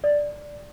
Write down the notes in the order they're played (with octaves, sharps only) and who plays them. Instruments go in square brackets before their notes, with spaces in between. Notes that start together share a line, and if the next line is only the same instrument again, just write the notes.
[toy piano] D5